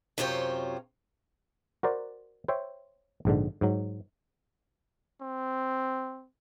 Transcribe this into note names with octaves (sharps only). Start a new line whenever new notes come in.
F#2 C3 F4 C5 C#5 G5
F#4 A#4 C5 D5
C5 C#5 E5 G5
A#1 G#2 D3
G#2 F#3
C4